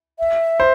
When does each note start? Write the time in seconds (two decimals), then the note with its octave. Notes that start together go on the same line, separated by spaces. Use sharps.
0.19 E5
0.60 C5